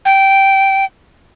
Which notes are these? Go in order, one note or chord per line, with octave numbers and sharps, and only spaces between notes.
G5